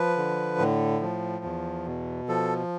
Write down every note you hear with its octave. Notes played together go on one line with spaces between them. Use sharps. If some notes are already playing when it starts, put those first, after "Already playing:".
Already playing: F3 B4
D3
A2
F3
E2
B2
F3 A4